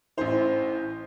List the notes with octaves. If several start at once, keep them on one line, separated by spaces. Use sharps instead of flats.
A1 A2 E3 C5